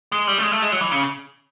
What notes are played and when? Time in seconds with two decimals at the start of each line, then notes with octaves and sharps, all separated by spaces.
0.12 G#3
0.27 G3
0.38 A3
0.42 G#3
0.51 A3
0.62 G#3
0.72 F#3
0.81 E3
0.91 C#3